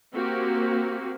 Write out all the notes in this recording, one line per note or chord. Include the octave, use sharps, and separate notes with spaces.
A#3 C4 F#4 G4